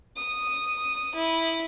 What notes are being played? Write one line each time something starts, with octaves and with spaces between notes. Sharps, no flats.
D#6
E4